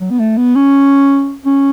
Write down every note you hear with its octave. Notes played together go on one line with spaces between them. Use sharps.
F#3
B3
A3
B3
C#4
C#4